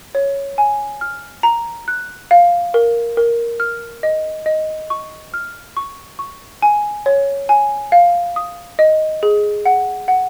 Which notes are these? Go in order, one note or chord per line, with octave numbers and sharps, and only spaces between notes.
C#5
G#5
F6
A#5
F#6
F5
A#4
A#4
F6
D#5
D#5
C#6
F6
C#6
C#6
G#5
C#5
G#5
F5
D#6
D#5
G#4
F#5
F#5